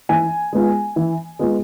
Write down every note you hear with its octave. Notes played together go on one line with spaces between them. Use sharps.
E3 G#5
G#3 B3 F4
E3
G#3 B3 F4